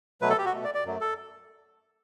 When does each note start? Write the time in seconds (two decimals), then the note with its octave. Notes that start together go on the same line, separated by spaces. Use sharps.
0.21 B2 F#3 A3 B4
0.30 A4
0.38 G4
0.46 F#4
0.54 B2 A3
0.64 D5
0.74 D5
0.85 F#2 F#3 A3
1.01 A4